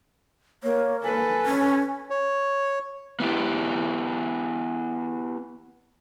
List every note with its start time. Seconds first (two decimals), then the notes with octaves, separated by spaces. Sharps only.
0.63 A#3 C#5
1.04 A4 B4 G#5
1.46 C#4
2.10 C#5
3.20 B3 E4 G4